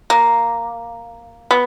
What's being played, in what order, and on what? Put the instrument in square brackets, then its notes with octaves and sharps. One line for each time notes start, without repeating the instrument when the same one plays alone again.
[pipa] A#3
B3